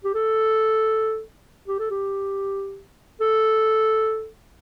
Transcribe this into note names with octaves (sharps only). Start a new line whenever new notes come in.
G4
A4
G4
A4
G4
A4